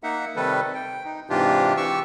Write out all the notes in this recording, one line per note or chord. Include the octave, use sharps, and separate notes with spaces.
A#3 D#4 E5 F#5
C3 D#3 G3 A4 B4
G5
D#4
G#2 C3 E3 D4 F4 G4
E3 G4 C#6 E6